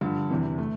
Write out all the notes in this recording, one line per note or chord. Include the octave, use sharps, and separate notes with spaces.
G2 D3 F3
E2 C3 E3
A3